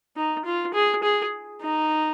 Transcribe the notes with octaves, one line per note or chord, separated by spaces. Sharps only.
D#4
F4
G#4
G#4
D#4